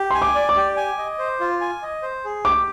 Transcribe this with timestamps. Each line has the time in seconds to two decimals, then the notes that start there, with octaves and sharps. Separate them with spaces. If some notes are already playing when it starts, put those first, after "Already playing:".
Already playing: G4
0.11 G#5 C6
0.22 D6
0.35 D5
0.49 D6
0.56 G4
0.77 G#5
0.98 D#5
1.19 C5
1.40 F4
1.61 G#5
1.83 D#5
2.02 C5
2.25 G#4
2.45 G4 D6